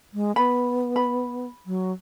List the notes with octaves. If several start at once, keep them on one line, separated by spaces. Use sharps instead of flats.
G#3
B3 B5
B5
F#3